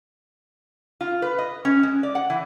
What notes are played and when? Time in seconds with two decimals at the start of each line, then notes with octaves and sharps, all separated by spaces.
1.01 F4
1.22 B4
1.38 D#5
1.65 C#4
1.83 G#3
2.03 D5
2.15 F#5
2.30 E3